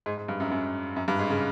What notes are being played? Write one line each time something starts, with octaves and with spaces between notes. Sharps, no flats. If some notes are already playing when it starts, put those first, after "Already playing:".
G#2
G#2
G2
F#2
F#2
F#2
G2
G#2
C#3